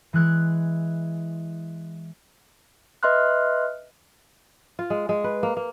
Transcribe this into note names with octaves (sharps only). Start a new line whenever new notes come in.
E3 G#3 F#6 G#6
B4 D#5 E5 C6 F6 F#6
F4
G#3
G#3
B4
A#3
A#3